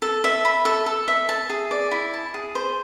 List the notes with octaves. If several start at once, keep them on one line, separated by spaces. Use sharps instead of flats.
A4
E5
B5
A4
A4
E5
A5
G#4
D5
E4
A5
G#4
C5